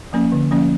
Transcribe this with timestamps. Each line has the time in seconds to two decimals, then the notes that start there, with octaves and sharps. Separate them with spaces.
0.13 F3 A#3 C#4
0.32 D3
0.51 F3 A#3 C#4